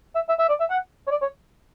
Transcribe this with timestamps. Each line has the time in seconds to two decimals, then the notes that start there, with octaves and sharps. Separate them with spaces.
0.15 E5
0.29 E5
0.39 E5
0.49 D5
0.60 E5
0.70 F#5
1.07 C#5
1.11 D5
1.22 C#5